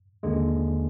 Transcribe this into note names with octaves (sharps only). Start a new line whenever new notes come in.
D#2 D3 G#3